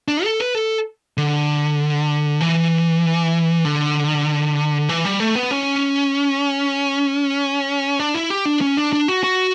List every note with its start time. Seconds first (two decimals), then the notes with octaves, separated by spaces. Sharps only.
0.08 D4
0.24 A4
0.40 B4
0.55 A4
1.17 D3
2.41 E3
3.65 D3
4.89 E3
5.05 G3
5.20 A3
5.35 B3
5.51 C#4
8.00 D4
8.14 E4
8.30 G4
8.45 D4
8.61 C#4
8.77 D4
8.93 D4
9.08 F#4
9.24 F#4